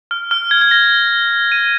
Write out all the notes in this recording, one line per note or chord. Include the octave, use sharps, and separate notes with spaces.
F6
F6
G#6
G#6
A#6
D#7